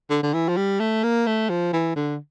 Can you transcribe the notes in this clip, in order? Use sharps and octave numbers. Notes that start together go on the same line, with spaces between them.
D3
D3
E3
F3
G3
A3
A#3
A3
F3
E3
D3